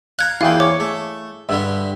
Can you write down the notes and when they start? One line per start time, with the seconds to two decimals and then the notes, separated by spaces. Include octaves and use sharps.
0.19 F5 A#5 F#6 G#6
0.41 E2 A#3 E4 G#4 F5 G5
0.60 C#5 D6
0.80 A3
1.49 G2 D3 G3 E5